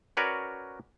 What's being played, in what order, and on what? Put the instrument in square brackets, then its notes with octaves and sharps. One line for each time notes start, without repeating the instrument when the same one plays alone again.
[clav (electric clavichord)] C#4 F#4 A#4 B4 C#5 D5